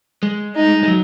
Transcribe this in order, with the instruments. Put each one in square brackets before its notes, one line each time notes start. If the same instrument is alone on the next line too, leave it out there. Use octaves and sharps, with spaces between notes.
[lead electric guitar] G#3
[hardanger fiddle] D#4
[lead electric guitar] G#3
F#3